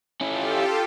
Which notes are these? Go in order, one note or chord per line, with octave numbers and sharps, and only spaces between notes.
C#4 E4 F4 G4 A4